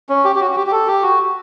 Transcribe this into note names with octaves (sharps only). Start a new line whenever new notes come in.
C#4
G4
G4
F#4
F#4
G4
G4
A4
G4
F#4